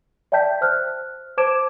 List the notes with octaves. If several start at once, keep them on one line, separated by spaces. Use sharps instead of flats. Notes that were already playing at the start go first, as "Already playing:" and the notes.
D5 E5 G5 A5 G6 B6
C5 F6 F#6
C5 A5 D6 G#6 D7 E7